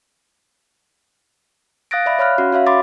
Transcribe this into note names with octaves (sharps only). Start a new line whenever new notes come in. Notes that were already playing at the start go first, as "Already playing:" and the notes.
F5 D#6 F#6 A6 A#6 D7
D5 E5 B5
C#5 F5 B5 F6 F#6
C#4 F#4
F#4 C#5 E5 F5
B5 C6 D6 A6